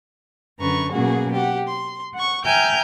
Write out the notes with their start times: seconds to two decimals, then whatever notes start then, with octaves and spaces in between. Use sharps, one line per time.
0.59 F#2 D3 C#4 B4 A#5 C#6
0.91 B2 F#3 A#3 C#4 F#4 G#4
1.32 G4 F#5
1.67 C6
2.14 F#5 C#6
2.44 E5 G5 G#5 A#5 F6 G6